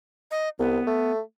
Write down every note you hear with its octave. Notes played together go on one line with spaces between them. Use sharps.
D#5
C2 B3
A3